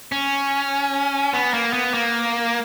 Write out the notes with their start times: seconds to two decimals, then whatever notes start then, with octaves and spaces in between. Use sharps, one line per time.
0.12 C#4
1.33 B3
1.54 A#3
1.73 B3
1.94 A#3